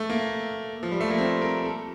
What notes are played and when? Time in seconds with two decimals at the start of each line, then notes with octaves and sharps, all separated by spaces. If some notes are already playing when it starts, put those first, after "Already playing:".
Already playing: A3
0.10 A#3
0.83 F3
0.92 G3
1.01 A3
1.10 A#3
1.18 C4
1.42 A#4
1.65 A4